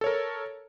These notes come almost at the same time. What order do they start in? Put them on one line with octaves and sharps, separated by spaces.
A4 C#5 A#4